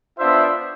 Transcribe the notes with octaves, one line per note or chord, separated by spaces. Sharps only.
B3 D4 F4 C5 E5